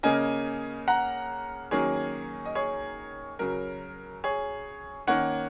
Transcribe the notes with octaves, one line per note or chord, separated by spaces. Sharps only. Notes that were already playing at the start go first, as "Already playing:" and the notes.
C#3 A#3 C#4 D#5 G#5
F#5 A#5
D#3 F#3 A#3 C#4 G#4 C#5
D#5
G#4 C#5
C#3 F#3 C#4 A#4
G#4 C#5
D#3 A#3 C#4 C#5 F#5